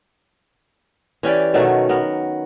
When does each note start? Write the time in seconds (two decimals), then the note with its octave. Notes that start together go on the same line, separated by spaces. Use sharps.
1.23 E3 C#4 G4 D5
1.54 B2 D#3 F#3 A3
1.89 B3 A#4